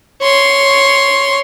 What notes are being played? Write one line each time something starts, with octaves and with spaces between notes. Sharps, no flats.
C#5 C6